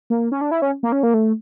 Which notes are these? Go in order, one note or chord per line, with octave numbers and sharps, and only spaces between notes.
A#3
C#4
D4
E4
C#4
A#3
C#4
A#3
A3